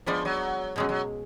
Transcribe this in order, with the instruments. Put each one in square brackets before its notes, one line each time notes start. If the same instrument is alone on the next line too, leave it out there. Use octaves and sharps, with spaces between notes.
[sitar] F3 [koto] G#3 B3 D4
[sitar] F#3
[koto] B2 G#3 C#4 [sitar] F#3
[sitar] F#3